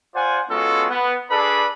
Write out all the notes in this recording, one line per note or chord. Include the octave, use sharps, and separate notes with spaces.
F4 C5 D5 F#5 G#5
G#3 B3 C#4 F4 F#4 A4
B3
D4 G#4 A4 B4 D5 B5